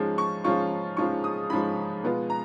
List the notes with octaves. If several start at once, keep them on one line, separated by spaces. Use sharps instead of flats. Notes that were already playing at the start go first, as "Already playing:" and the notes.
Already playing: G#2 F3 G#3 C#4 F4
C#6
G#2 F3 G#3 C#4 F4 C#6
G#2 F3 G#3 C#4 F4 C#6
D#6
G#2 F3 G#3 C#4 F4 B5
B2 G#3 B3 F4
A#5